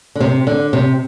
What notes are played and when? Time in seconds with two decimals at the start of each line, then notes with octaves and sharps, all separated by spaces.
0.15 D3
0.20 C3
0.47 D3
0.73 C3